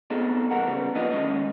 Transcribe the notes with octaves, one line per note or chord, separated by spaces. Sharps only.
B3 C4 D#4 G#4 A4
C2 E3 A#4 F#5
C#3 G3 B3 C#4
F3 A#3 B3 D4 D#4 D#5
D#3 G#3 C#4 E4 D#5